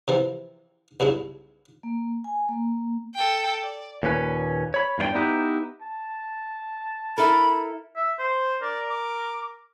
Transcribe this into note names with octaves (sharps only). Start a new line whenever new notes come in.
C3 E3 F3
B1 G2 C#3 E4
A#3
G#5
A#3
A4 G5
D5
D#2 A#2 C#4 B4
C#5 B5
E2 G2 F4 D5 G5
B3 D#4 E4 G4 B4
A5
E4 A4 A#4 B5
E5
C5
A#4 D5
D6